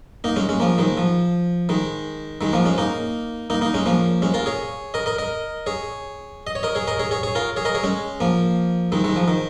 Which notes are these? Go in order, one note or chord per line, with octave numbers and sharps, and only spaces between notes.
A#3 D#4
G#3 C#4
G#3 C#4
F3 A#3
D#3 G#3
F3
D#3 G#3
D#3 G#3
F3 A#3
G#3 C#4
A#3 D#4
A#3 D#4
A#3 D#4
G#3 C#4
F3 A#3
G#3 C#4
F4 A#4
G#4 C#5
A#4 D#5
A#4 D#5
A#4 D#5
G#4 C#5
D#5
C#5
A#4 D#5
G#4 C#5
A#4 D#5
G#4 C#5
G#4 C#5
G#4 C#5
F4 A#4
G#4 C#5
A#4 D#5
G#4 C#5
G#3 C#4
F3 A#3
D#3 G#3
D#3 G#3
F3
D#3